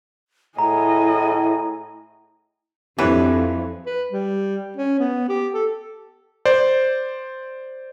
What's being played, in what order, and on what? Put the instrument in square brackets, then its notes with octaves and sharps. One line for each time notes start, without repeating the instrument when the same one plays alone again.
[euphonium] A2 [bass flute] E4 [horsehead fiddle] G#4 D#5 [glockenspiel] A#5
[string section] F2 [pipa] E3 [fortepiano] D4 B4 C#5 [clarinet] G4
[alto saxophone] B4
G3
C#4
B3
G4
A4
[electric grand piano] C5 D5